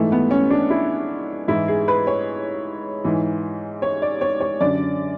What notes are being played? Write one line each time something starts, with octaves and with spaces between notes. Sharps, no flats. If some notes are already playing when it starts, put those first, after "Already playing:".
Already playing: G#2 E3 A3
B3
C#4
D4
E4
G#2 E3 E4
G#4
B4
C#5
G#2 E3
C#5
D5
C#5
C#5
F#2 D3 D5